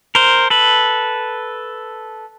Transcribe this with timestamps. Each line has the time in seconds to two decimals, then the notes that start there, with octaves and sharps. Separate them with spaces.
0.15 A#4 C5
0.50 A4 B4